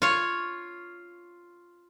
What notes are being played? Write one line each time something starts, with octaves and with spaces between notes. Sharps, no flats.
F4 C#5